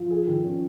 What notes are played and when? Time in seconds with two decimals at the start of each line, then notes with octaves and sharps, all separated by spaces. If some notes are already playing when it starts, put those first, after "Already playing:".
Already playing: F3
0.11 G#4
0.27 D#3
0.44 C#4